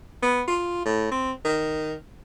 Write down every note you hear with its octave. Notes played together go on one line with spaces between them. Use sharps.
B3
F4
A2
C4
D#3